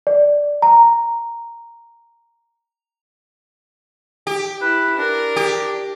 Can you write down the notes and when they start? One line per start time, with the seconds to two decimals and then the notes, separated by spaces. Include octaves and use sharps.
0.07 D5
0.62 A#5
4.27 G4
4.61 E4 B4
4.98 D4 A#4
5.36 G4